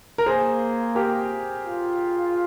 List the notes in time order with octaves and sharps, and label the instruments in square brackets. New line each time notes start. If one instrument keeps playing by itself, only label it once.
[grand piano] A#4
[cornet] A#3 [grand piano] G#4 C5
[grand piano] G4 A#4
[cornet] F4